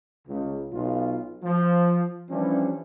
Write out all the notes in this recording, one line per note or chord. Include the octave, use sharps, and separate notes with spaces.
C#2
B1 F4
F3
E3 F3 G3 C#4 D4